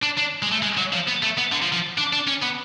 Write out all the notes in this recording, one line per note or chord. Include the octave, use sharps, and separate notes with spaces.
D4
D4
G#3
A3
G#3
F#3
F3
B3
A3
B3
D3
F3
F3
D4
D4
C#4
B3